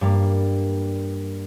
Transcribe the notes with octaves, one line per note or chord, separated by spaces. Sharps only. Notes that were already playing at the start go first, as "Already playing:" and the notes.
G2 G3 A#3